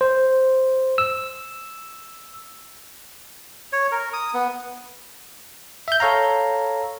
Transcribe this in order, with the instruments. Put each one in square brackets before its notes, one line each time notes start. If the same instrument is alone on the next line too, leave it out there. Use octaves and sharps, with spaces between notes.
[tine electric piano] C5
E6
[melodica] C#5
A#4
D#6
B3
[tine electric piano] E5 G6
A4 C#5 F5 A#5